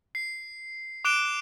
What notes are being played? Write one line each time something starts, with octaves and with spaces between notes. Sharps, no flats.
C7
D6 F#6 D7 E7 G7